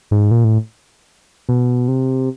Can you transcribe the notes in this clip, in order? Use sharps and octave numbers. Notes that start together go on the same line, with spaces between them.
G#2
A#2
A2
B2
C3